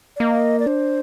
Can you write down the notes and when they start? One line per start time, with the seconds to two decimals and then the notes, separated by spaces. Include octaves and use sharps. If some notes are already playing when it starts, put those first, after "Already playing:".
0.16 D5
0.20 A#3 D#5
0.60 D5
0.66 D4 C5